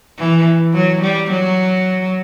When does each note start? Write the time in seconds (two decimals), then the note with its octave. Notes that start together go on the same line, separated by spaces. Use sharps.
0.19 E3
0.74 F#3
1.02 G3
1.31 F#3